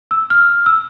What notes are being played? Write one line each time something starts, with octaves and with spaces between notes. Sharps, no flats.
E6
F6
E6